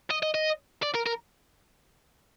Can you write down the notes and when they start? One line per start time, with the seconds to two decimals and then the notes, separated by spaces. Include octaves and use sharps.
0.11 D#5
0.23 D#5
0.35 D#5
0.83 D5
0.95 A#4
1.06 A#4